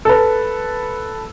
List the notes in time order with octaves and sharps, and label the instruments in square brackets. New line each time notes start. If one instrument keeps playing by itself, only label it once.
[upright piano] A4 B4